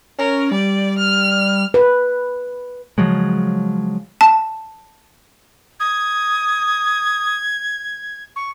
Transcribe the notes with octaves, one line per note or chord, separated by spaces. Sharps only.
C#4 A#4
G3 D5
F6
B4
C#3 F3 F#3 G#3
A5
D#6 G#6
C#6